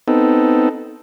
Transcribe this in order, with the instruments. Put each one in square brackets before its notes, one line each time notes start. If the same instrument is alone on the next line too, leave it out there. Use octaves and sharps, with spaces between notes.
[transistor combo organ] B3 C4 D#4 A4